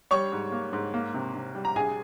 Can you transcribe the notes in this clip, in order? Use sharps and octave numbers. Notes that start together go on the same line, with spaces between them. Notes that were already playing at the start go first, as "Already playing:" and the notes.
G3 C#5 C#6
G#2
A#3
G#2
A#3
C3
C3
G3
A#5
A#1 G#4 G#5